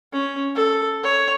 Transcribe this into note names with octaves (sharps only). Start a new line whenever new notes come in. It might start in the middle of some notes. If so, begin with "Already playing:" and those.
C#4
A4
C#5